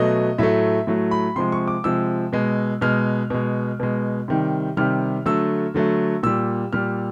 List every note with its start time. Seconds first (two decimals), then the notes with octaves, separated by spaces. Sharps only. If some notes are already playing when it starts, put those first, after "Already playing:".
Already playing: B2 F#3 A3 D#5
0.38 A2 F#3 A3 E5
0.87 A2 F#3 A3
1.11 B5
1.36 C3 F3 G#3 C6
1.52 C#6
1.68 D6
1.84 C3 F3 G#3 E6
2.33 B2 G#3
2.81 B2 G#3 F6
3.30 B2 G#3
3.80 B2 G#3
4.28 C3 D#3 G3
4.77 C3 D#3 G3 F6
5.26 D3 F#3 A3 E6
5.74 D3 F#3 A3
6.23 A#2 G3 E6
6.73 A#2 G3 F6